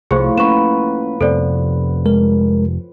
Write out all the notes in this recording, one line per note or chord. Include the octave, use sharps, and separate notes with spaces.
C2 A2 F3 G#4 C5 C#6
A#3 C#4 B4 C#6 E7
F2 C3 B3 A4 C5 D5
G#3 A#4